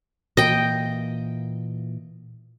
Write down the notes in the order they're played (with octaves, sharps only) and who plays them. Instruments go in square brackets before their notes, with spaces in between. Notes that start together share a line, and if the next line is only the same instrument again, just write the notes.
[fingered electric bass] A#2 E3 A#3 [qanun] D#5 G5